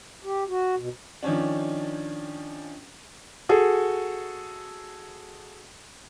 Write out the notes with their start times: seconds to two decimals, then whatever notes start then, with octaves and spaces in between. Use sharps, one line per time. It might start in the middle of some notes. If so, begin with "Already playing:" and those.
0.24 G4
0.48 F#4
0.77 B2
1.23 D#3 F3 C#4 D4
3.49 F#4 G#4 A4